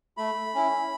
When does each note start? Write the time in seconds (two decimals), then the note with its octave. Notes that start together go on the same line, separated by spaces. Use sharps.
0.17 A3 B5
0.55 C#4 E4